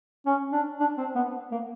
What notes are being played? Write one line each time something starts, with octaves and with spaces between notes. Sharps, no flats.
C#4
D4
D4
C4
B3
A#3